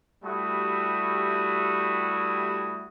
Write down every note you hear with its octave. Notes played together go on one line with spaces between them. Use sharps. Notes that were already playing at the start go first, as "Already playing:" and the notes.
G3 A3 E4 F#4 G4 D#6